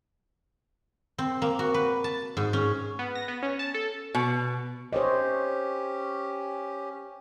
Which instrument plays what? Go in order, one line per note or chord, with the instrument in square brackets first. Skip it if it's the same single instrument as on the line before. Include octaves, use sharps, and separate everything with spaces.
[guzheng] C4
A#3
F#4
B4
A5
G#2
C#4
[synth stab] B3
A#6
B3
C#4
A5
A4
[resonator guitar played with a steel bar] B2
[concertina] C#4 G4 [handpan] C5 C#5 D#5